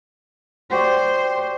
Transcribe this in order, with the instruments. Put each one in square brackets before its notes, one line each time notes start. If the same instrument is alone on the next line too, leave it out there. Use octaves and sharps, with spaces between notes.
[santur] F#4 G4 D5 [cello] C5